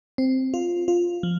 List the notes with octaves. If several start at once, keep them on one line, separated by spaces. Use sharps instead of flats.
C4
F4
F4
F3